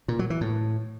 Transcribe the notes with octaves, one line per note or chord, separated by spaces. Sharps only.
A#2
F#3
E3
A2